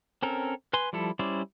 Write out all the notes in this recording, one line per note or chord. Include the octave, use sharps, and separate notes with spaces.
C4 C#4 A4 A#4
B4 G#5 C6
F3 G3 E4 A4
G3 C#4 E4 C5 D5